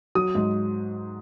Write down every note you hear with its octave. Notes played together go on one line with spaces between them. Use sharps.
F#3 D#6
G#2